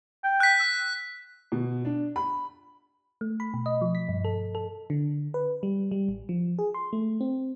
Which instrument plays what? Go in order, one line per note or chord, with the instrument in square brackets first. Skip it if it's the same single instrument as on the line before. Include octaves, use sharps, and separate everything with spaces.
[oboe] G5
[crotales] F#6 B6
[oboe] E6
[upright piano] B2
D4
B5
[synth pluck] A3
B5
B2
D#5
F3
B6
G2
A4
A4
[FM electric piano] D3
B4
G3
G3
A1
F3
G#4
C6
A3
C4